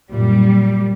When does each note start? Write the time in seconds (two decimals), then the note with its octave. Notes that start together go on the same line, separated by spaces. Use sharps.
0.11 F#2 A#2 G3